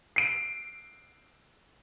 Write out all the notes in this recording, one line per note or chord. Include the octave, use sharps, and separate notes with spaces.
C7 D7